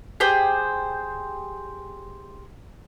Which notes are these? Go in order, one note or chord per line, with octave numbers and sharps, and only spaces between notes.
G4 G#4 C5 G5